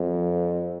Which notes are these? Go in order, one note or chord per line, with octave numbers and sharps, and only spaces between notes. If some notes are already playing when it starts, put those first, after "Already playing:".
Already playing: F2